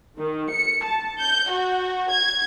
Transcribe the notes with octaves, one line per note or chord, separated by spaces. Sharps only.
D#3
C#7
A5
G6
F#4
G#6